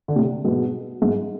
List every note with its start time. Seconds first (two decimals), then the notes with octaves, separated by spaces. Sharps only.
0.08 D3
0.16 A2 C3
0.44 G#2 B2
1.02 G#2